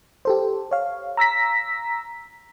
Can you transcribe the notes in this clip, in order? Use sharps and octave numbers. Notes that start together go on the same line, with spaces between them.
G4 A4 C5
C#5 F5
A#5 E6 A#6 B6